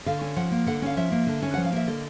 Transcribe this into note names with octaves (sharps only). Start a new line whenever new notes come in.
D3 F5
C#4
F3 F#5
A#3
D3 F#5
C#4 F5
F3 E5
A#3
D3
C#4
F3 F#5
F5
A#3 E5
D3 D#5